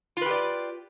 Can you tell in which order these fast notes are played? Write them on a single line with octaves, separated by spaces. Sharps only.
F4 B4 G4 D5